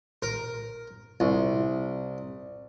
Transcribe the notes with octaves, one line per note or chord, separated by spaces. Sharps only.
A#4
C2